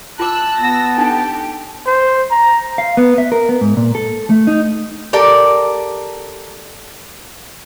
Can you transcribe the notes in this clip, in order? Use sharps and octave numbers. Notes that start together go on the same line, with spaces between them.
F4 A5 D6 E6 F#6
B3 E6 A#6
D4 D#4 G4 A4
C5
A#5
F5
B3
E5
A#4
B3
G#2
A#2
A4
A3
D#4
G4 A4 A#4 D5